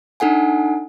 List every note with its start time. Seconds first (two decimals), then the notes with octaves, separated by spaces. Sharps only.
0.20 D4 D#4 A4 F#5 G#5